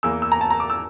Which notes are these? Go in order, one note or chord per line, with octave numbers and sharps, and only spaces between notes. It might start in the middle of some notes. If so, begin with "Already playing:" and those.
E2 E3 A#3 E6
E6
A#5
A5
A#5
D6
E6